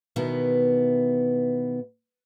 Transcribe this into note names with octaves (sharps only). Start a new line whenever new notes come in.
B2 D#3 E3 B3